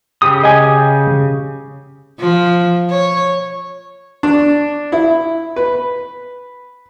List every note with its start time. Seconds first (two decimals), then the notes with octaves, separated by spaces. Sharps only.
0.22 C#3 G4 D#6
0.44 D#5 G#5
2.19 F3
2.90 C#5
4.23 D4
4.92 E4
5.56 B4